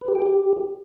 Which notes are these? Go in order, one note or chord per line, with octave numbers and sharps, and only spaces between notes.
B4
G4
G5
G4